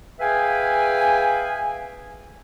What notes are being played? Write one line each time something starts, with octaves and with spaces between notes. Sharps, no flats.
G#4 B4 E5 F5 G5 G#5